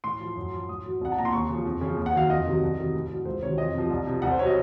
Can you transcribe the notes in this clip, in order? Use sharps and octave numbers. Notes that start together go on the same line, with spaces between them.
A2 C6
F3
F#2
F3
A2 D#6
F#3
C2 F#5
A5
A#2 F3 A#5
C6
D#2 C#6
C#3 F3
F2
C#3 F3
D#2
F#5
D#3 F#3 F5
F2 D#5
C3 D#3 F#3
C2
C3 D#3 F#3
A2
F#3
C#2 C5
C3 D#3 F#3 C#5
F2 D#5
C3 F3
C2
C3 F3
C2 F#5
C5
C3 F#3 C#5 D#5